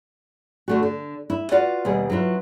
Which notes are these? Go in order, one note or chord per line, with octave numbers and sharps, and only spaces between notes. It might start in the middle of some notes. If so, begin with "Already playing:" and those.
D3 A3 F#4
D3
E4
F4 F#4 B4 D5 F5 F#5
D#2 B2 G3 G#4 F#5
F#3 C#4 E4 F4 B4